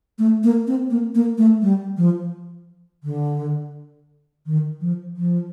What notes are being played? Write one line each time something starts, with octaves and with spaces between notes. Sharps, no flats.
A3
A#3
C4
A#3
A#3
A3
G3
F3
D3
D#3
F3
F3